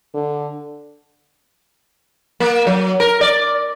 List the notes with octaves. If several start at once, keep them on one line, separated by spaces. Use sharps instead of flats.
D3
A#3
F#3
A#4
D5